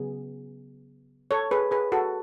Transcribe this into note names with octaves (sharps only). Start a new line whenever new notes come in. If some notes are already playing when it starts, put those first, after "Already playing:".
Already playing: C#3 F#3 B3 G#4
A4 C#5
G#4 B4
G#4 B4
F#4 A4